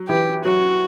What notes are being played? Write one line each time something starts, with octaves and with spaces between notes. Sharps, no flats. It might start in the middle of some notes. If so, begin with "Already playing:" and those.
Already playing: F#3
E3 G4
F#3 F#4